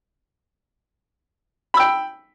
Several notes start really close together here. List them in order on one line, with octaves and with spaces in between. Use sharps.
B5 E6 G5